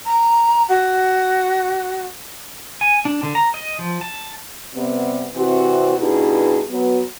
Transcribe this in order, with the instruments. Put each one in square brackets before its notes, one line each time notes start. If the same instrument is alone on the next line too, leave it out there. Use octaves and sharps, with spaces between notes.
[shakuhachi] A#5
F#4
[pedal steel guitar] G#5
D4
D3
A#5
D#5
F3
A5
[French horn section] C3 G3 B3
C3 E3 G3 C4 F#4
G2 B2 D#4 E4 G#4
F#3 B3